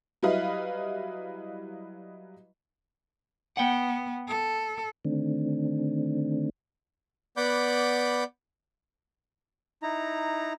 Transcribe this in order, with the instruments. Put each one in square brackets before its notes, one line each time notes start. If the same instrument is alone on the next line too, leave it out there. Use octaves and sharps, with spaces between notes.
[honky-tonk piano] F#3 G3 E4 B4 D#5 F5
[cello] B3 [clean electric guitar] F#5 G5
[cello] A4
[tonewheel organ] D3 D#3 A3 C4 D4
[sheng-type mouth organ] B3 D5 F#5 B5 D6 G6
D#4 E4 A#5